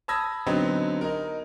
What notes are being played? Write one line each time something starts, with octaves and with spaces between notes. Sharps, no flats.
A5 B5 D#6 E6 G#6 A#6
D3 F#3 B3 C4 D#4
D#4 A#4